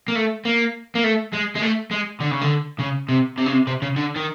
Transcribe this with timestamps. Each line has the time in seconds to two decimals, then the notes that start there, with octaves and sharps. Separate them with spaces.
0.08 A#3
0.15 A3
0.45 A#3
0.95 A#3
1.04 A3
1.33 G#3
1.55 G#3
1.62 A3
1.91 G#3
2.20 D3
2.31 C#3
2.41 D3
2.79 C#3
3.09 C3
3.38 C3
3.46 C#3
3.52 C3
3.67 C3
3.82 C#3
3.96 D3
4.16 D#3